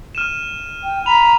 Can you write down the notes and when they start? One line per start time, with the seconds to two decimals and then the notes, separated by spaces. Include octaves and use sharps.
0.15 F6 D#7 E7
0.84 G5
1.06 A#5 B5 F7